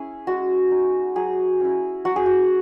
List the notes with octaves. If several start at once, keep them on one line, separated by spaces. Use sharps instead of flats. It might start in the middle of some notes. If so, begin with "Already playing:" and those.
Already playing: C#4 E4 G#4
G#3 F#4
D#4
F#3 G#4
C#4 E4
F#3 F#4
G#4
F#4